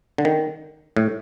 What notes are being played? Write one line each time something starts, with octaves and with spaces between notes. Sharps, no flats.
D3
D#3
A2